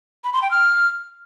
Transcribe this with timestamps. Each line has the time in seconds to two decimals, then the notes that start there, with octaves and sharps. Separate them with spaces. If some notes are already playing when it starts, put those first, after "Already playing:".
0.24 B5
0.33 C6
0.42 G5
0.51 F6